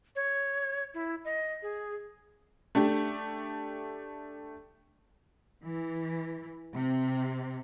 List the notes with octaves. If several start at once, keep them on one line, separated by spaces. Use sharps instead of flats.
C#5
E4
D#5
G#4
A3 D4 G4
E3
C3